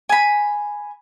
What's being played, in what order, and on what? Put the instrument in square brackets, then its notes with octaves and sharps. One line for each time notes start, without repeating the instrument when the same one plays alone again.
[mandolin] G#5 B5